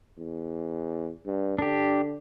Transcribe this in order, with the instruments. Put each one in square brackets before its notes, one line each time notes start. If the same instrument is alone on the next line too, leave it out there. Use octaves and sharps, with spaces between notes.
[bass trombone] E2
G2
[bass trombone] D3 [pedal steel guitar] D4 G4